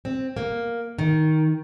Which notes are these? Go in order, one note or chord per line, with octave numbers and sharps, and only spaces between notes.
C4
A#3
D#3